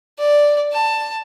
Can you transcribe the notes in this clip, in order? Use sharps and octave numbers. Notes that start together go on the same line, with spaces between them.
D5
A5